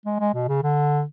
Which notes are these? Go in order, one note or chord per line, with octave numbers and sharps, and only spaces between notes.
G#3
G#3
B2
C#3
D3